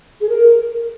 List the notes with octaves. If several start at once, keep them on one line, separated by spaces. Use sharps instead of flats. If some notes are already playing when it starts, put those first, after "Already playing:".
G#4
A#4